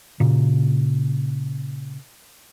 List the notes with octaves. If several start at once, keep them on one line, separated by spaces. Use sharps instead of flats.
A#2 C#3